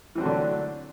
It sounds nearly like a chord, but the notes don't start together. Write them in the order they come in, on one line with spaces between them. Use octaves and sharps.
E3 C4 F#3 A3 D3